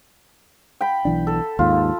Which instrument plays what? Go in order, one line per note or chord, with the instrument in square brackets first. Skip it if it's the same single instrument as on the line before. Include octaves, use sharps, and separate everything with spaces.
[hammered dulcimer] G5 B5
[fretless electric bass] B1 E3 D4
[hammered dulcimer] A4
[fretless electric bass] D#2 G#2 [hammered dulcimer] F4